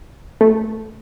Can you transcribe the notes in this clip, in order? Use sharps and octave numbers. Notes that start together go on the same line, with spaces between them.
A3